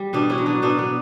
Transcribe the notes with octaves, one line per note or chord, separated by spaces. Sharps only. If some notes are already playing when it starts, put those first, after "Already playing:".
Already playing: G3
B2 B3 D4
C#4 E4
F#3
B3 D4
B2 B3 D4
B3